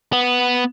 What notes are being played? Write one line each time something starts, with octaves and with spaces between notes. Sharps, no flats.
B3